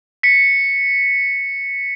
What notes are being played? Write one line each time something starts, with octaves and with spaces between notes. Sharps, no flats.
B6 C#7